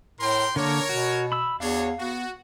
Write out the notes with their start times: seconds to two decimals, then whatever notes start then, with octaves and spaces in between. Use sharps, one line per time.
0.20 A2 A#4 G5 C6
0.56 D3 A#3 D4 A#4 C#5
0.89 B2 F#4
1.32 B5 E6
1.60 E2 D4 F#4 C#5 F5
1.99 B3 F#4